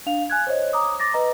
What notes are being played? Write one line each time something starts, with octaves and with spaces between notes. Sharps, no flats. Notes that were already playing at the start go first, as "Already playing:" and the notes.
D4 F5 F7
G#5 F#6 G#6
C5 C#5 D#5
A#5 D6 D#6
D6 A6 A#6
B4 D#5 A#5